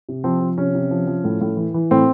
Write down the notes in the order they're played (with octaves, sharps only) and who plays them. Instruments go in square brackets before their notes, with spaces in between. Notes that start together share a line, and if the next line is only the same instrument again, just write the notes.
[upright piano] C3
F3 C4
F3
C3 C#4
C3
F3
F3
A2
A2
E3
E3
A2 C4